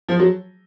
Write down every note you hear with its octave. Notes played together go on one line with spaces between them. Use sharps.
F3
F#3